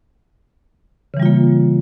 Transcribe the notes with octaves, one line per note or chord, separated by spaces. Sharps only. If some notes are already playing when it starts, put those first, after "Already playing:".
C#3 E3 G3 A#3 F4